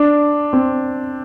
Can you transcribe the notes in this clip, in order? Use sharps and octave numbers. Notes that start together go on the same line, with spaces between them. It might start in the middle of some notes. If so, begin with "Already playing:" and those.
Already playing: D4
C4